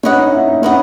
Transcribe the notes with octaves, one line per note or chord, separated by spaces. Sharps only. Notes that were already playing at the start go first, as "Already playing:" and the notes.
C#4 B4 D#5 F#5
D#4
E4
D#4
C#4 B4 D#5 F#5